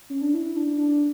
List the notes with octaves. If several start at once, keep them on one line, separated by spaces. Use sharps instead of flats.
C#4
D4
E4
D4
D4